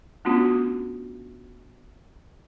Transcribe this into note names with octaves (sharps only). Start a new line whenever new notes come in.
A3 B3 C#4 D4 F4 F#4